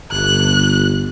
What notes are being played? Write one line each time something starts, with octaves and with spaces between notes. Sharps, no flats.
G1 F#6